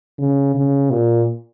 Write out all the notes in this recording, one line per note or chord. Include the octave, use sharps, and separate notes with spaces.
C#3
C#3
A#2